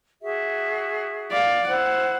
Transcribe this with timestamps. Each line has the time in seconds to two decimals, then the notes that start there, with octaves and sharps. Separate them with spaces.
0.22 F#4 G#4 E5
1.31 D5 F5
1.67 E4 C5 F#5